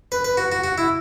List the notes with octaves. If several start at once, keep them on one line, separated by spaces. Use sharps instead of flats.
B4
B4
F#4
F#4
F#4
E4